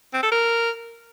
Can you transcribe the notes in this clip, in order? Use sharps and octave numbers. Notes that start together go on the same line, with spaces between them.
C4
A4
A#4